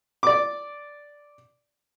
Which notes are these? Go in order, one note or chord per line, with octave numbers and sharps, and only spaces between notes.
D5 D6